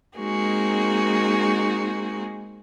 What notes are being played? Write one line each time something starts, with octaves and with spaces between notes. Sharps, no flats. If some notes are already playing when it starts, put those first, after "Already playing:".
G#3 A#3 C4 D#4 F#4 G#4